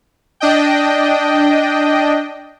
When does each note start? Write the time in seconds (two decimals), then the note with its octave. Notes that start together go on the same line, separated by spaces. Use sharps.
0.40 D4 D#5 G5